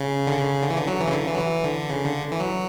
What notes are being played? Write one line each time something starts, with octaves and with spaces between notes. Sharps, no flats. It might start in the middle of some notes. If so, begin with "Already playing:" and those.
Already playing: C#3
D3
C#3
D3
E3
D3
F#3
E3
C#3
D3
E3
F#3
E3
D3
C#3
D3
E3
F#3